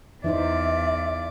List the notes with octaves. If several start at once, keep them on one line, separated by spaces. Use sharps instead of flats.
E2 E3 D#4 C5 D5 E5